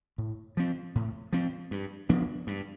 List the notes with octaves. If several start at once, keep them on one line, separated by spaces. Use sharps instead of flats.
A2
F3 C4
A2
F3 C4
G2
F3 B3 D4
G2